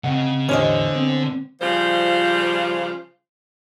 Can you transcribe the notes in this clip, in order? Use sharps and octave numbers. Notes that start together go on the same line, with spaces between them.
C#3 C4 D#5 F#5
E2 A2 D3 C#4 G4 C5 D#5
B3 C4
C#3 F3 G3 F4 C5